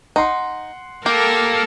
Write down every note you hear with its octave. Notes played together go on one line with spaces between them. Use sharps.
D#4 F#5 C6
A#3 G4 A4 A#4